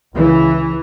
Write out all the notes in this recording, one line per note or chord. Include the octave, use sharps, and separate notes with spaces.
C#2 C#3 E3